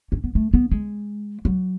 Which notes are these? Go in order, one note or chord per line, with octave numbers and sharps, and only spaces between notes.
C#4
B3
A3
B3
G#3
F#3